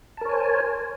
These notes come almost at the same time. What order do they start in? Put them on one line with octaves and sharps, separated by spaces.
A5 A#4 C#5 G#5 C5